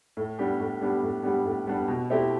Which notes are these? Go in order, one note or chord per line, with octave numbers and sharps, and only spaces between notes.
A2
G3 B3 D4 G4
A2
G3 B3 D4 G4
A2
G3 B3 D4 G4
A2
G3 B3 D4 G4
B2
A3 C4 E4 G4